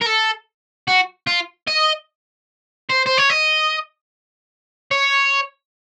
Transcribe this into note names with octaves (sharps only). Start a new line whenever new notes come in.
A#4
A4
F#4
F4
D#5
C5
C5
C#5
D#5
C#5